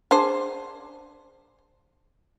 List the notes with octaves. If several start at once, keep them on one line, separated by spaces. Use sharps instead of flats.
D4 G#4 C5